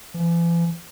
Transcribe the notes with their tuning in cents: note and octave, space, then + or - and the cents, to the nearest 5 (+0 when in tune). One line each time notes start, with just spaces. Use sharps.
E3 +45